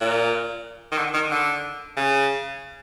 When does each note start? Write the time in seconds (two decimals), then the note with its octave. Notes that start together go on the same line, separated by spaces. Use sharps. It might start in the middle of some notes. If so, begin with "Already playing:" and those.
0.01 A#2
0.92 D#3
0.98 D3
1.14 D#3
1.31 D3
1.96 C#3